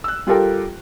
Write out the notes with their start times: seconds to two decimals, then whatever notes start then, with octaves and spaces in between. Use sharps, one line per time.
0.04 E6 F#6
0.27 G3 F4 G4 A4 A#4 G5